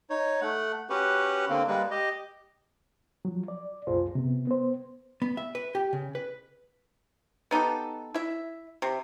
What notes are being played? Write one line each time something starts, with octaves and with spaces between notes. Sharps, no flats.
D#4 C#5
A3 F#5
C#4 F#4 G4 B4 F#5
D3 A#3 C4
G3 G#3 A#3 B4
G4 D#5
F3 F#3
D5
C2 F#2 A#2 F4 G#4 C5
C3 B3
B3 C5
B3
E5
B4
G4
C#3
B4
B3 D#4 G4 A4
E4 E5
C3